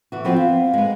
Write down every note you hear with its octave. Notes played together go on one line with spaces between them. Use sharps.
E3 F#4
F3 B3 C4
F5
G#3 B3